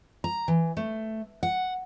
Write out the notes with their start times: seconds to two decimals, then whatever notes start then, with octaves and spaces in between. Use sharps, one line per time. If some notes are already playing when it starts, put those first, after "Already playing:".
0.24 A#5
0.48 E3
0.77 A3
1.43 F#5